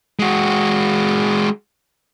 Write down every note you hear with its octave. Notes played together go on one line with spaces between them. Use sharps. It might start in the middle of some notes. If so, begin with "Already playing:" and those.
G#3 F#4